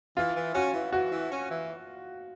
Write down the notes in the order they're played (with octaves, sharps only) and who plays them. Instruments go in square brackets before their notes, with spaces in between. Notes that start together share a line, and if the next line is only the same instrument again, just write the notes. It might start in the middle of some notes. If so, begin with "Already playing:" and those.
[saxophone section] E3 [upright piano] F4
[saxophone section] E3
[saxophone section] C#4 [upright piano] F#4
[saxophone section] E3
[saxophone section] E3 [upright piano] F#4
[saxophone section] E3
C#4
E3